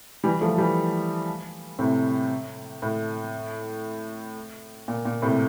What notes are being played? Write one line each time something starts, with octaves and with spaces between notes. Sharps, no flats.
E3 G3
F3 A3
E3 G3
A2 C3
A2
A#2
A#2
A2 C3